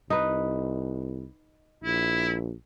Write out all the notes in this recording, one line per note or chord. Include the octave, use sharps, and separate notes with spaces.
C2 D#4 B4
A#1 E4